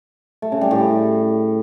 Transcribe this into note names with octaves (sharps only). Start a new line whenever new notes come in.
A3
C#3
G3
A2